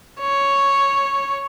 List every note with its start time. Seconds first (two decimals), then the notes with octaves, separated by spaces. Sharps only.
0.20 C#5